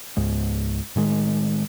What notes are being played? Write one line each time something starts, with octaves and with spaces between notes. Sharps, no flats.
C#2 G#2 G#3
A2 D#3 G#3